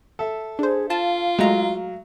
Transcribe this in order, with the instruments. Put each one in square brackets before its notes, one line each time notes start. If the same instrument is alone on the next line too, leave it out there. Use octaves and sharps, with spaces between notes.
[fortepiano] A4 E5
[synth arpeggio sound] D4 C5 [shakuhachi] G#4
[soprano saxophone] F4 [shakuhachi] F5 [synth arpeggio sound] A5
[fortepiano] F#3 [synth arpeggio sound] G#3 A3 A#5